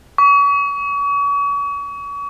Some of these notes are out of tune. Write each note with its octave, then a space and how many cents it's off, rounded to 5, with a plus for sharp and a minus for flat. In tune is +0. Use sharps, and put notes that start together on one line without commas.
C#6 +40